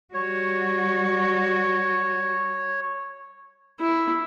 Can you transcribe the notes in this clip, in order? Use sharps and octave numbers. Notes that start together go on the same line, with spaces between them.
G3 F#4 C#5
E4